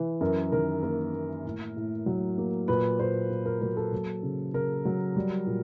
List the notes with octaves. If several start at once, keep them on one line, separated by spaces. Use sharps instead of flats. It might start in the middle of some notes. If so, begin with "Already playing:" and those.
Already playing: E3
F#2 A#4
D#3 A#4
A#3 A#4
A#3
A2
A2
F#3
A#3
A#2 B4
A#2 C5
A#3
A#4
F#3 A#4
A4
F#3
C#3
C#3 A#4
F#3
G3
A#2